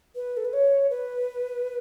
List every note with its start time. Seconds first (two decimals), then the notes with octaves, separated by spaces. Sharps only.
0.16 B4
0.37 A4
0.45 B4
0.53 C#5
0.90 B4